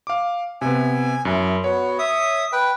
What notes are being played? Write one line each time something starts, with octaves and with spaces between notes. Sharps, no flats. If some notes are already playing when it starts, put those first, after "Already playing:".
F5 D6
C3 B3 G#5
F#2 E4
B3 F#4 C#5
E5 D#6
B4 G5